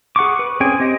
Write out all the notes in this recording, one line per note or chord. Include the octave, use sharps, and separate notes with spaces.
G#4 F#5 C#6 D6
B4
C4 C#4 G#4 G5 G#5
C4 G4 D#5